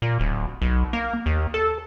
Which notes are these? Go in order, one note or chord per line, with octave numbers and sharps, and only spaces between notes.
A#2
D1
B1
A#3
D#2
A4